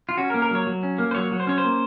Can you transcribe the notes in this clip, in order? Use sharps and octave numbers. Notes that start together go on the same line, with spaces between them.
F4
C#4 F#4
A#4
A#3
A#4
F#3 C#5
F#3
C#4
A#3
C5
F#3 C#5
F#3
C5
C#4 C#5
C5
A#3